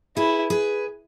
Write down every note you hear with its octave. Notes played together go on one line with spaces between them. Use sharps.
E4 G#4 B4
G#4 B4